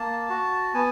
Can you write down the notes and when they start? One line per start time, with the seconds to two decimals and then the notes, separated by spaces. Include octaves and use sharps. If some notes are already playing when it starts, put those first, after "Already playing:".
Already playing: A#3 A5
0.30 F#4
0.74 B3 G#5